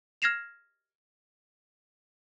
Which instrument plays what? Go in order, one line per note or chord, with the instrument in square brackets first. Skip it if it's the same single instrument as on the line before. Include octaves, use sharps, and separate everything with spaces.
[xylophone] F6 G#6 A#6 C7 E7 F7